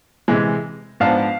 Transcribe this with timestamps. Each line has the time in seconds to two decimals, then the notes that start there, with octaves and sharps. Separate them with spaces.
0.28 C3 E3 G#3
1.00 G#2 F3 B3 D4 F5 A5